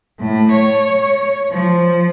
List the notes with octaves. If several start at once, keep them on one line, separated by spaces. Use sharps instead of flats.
A2
C#5
F3